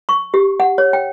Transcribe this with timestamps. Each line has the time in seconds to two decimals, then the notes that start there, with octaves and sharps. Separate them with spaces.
0.09 C#6
0.34 G4
0.60 F#5
0.78 C#5
0.93 G5